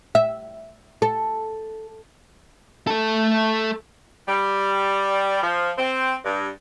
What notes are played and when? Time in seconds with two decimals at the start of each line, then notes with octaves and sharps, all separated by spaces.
0.15 E5
1.02 A4
2.87 A3 A4
4.27 G3
5.42 F3
5.78 C4
6.24 G2